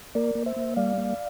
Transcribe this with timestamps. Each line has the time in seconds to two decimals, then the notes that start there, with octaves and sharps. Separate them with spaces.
0.15 A#3 A#4 D5
0.35 A#3
0.46 C5 E5
0.56 A#3
0.76 G3 D5 F5
0.97 A#3